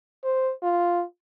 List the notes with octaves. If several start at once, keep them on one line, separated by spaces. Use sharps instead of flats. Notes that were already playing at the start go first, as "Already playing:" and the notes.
C5
F4